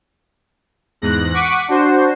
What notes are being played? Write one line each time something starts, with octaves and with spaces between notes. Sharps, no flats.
E2 G#2 F#6 A#6
F#5 C#6 D6 B6 D7 D#7
D4 F#4 C5